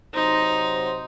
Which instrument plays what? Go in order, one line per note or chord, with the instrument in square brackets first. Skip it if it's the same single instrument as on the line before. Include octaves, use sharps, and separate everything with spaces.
[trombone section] C3 F#3 C5 [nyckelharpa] D#4